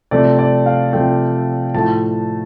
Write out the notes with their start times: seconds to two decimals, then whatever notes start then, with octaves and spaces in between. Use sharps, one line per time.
0.11 C3 F3 A3 D5
0.39 D5
0.66 F5
0.93 C3 F3 A3 G5
1.74 A2 F3 A3 A5